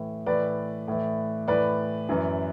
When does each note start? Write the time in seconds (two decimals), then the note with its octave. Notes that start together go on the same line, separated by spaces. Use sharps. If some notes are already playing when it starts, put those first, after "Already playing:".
Already playing: A2 E3
0.26 A2 E3 B4 D5
0.88 A2 E3
1.48 A2 E3 B4 D5
2.09 F#2 E3